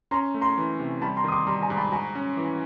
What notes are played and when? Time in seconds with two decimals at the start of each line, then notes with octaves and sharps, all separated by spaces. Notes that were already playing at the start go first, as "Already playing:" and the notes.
0.11 C#4 A#5 C6
0.34 A3
0.41 A#5 C6
0.57 E3
0.80 C3
1.01 G3 A5 B5
1.17 A#5 C6
1.24 D#3 D#6
1.32 C6 D6
1.47 G3 A#5 C6
1.62 G#5 A#5
1.70 G#2
1.77 A5 B5
1.92 F#4 G#5 A#5
2.15 C#4
2.37 E3